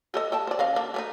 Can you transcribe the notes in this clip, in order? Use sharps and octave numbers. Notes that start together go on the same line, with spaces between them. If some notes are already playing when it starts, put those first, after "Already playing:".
G4 A4 D#5
A4 G5 A5
C5 D5
C#3 D#5 F5
A#3 D4
A3 C#4 D#4